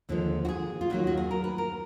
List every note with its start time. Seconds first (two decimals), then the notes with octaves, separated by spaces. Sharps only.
0.09 D#2 D3 F3 G#3
0.45 F#4
0.49 G#4
0.81 F4
0.90 D#2 D#3 F#3 A#3 F#4
1.07 F#4
1.17 G#4
1.31 A#4
1.44 B4
1.58 A#4